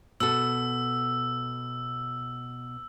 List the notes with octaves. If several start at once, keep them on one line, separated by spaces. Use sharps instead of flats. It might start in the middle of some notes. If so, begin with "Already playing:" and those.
B2 A4 E6